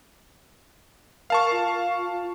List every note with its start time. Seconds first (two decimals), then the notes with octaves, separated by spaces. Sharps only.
1.30 A#4 F5 A5 C#6
1.51 F4